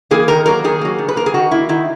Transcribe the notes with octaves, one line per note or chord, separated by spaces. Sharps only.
E3 A#3 G#4
D#3 A#4
F#3 A#3 A#4
D#3 G#4
F#3 A#3
D#3
B4
A#3 A#4
G#4
D#3 F#4
A#3 E4
D#3 E4